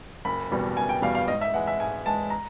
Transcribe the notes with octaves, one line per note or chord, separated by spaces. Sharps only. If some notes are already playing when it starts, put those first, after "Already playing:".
F#1 B5
E2 B2 G3 B3
F#1 G#5
G5
E2 B2 G3 B3 F5
F5
G#2 D#5
E5
E3 G#3 F#5
E5
G#2 G#5
E3 G#3 A5
A#5